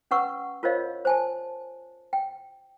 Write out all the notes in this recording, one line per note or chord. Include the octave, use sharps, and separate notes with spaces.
C#4 B4 F#5 C#6 E6
F4 A#4 C5 C#5 D#5 F5
C5 G#5 A5
G5